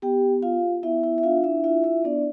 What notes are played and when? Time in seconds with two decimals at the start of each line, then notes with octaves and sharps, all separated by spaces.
0.02 B3 G4 G5
0.43 F4 F5
0.83 B3 E4 E5
1.03 E4 E5
1.18 E5
1.23 D4 F4 F5
1.44 E4 E5
1.64 E4 F4 E5
1.84 E4 E5
2.04 B3 D4 D5